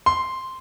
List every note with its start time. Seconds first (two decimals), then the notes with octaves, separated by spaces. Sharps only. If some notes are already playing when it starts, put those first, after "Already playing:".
0.06 C6